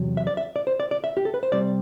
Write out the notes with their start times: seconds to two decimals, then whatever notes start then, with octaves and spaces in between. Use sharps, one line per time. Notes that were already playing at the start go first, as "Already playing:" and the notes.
Already playing: E2 C3 F#3
0.17 E5
0.27 D5
0.37 E5
0.56 D5
0.67 C5
0.80 D5
0.91 D5
1.04 E5
1.17 G4
1.25 A4
1.34 B4
1.43 C5
1.52 C2 C3 G3 C4 D5